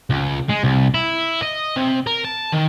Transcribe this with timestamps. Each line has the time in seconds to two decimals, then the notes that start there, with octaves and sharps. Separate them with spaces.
0.10 C#2
0.49 G#3
0.64 C2
0.94 E4
1.42 D#5
1.76 C3
2.07 A#4
2.24 A5
2.52 D#3